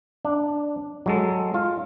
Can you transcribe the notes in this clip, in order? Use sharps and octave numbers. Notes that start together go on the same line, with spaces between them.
D4
F#3 G#3 A4
F4